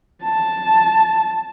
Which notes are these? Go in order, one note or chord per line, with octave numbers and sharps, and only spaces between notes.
A5